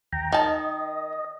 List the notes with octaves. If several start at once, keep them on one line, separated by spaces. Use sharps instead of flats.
D#2 G5 A#5
D#3 D#5 A5